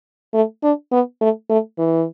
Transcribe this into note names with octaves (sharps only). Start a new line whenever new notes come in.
A3
D4
B3
A3
A3
E3